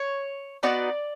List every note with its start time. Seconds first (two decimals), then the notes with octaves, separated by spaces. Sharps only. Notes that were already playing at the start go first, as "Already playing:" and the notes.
Already playing: C#5
0.63 B3 D#4 F#4 D5